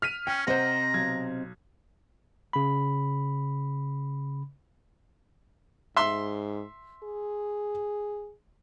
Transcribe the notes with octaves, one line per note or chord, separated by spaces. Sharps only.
F6 B6 D#7
C#4 G5
C3 C4 C5 D#5 F#5 A#5
B1 G#6
C#3 B5
G#2 E5 C6
G#4